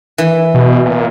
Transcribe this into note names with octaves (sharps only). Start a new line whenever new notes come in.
E3
B2
A#2